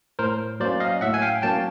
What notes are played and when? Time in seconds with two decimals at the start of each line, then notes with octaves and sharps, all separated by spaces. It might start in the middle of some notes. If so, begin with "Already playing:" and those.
0.19 A2 A#4 C5
0.60 F#3 A#3 C#4 C5 D5
0.80 D#5 F5
1.01 A2 E5 F#5
1.14 G#5
1.22 F5 G5
1.42 F#3 A#3 C#4 G5 A5